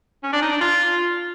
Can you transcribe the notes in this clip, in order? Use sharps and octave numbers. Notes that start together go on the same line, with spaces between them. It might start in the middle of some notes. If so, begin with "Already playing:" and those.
C#4
D4
D#4
D4
F4